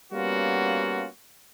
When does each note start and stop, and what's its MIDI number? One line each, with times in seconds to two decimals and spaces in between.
0.11 1.06 55
0.11 1.06 58
0.11 1.06 59
0.11 1.06 61
0.11 1.06 65
0.11 1.06 66